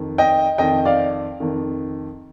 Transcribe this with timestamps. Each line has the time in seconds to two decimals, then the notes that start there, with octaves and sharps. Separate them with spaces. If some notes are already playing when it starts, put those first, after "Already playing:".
Already playing: F2 D#3
0.18 D#5 G5
0.58 F2 D#3 D#5 G5
0.85 D5 F5
1.40 F2 D#3